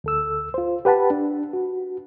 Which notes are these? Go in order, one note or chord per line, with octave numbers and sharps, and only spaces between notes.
D2 A4 E6
F4 C5
G4 B4 F#5 A5 B5
D4
F#4